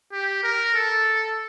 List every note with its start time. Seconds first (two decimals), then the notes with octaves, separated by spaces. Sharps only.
0.13 G4
0.44 A#4
0.75 A4